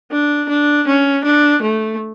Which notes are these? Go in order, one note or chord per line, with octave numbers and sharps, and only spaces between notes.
D4
D4
C#4
D4
A3